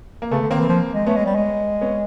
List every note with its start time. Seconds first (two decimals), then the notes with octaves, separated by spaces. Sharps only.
0.22 A#3
0.31 C#3 A3 B3
0.41 D3
0.50 D#3 A#3 C4
0.60 E3
0.69 F3
0.94 G#3
1.06 A3 B3 C#4
1.16 G#3
1.26 G3
1.35 G#3
1.81 B3 C#4